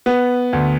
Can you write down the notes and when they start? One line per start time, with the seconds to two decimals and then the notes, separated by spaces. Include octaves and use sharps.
0.06 B3
0.53 D2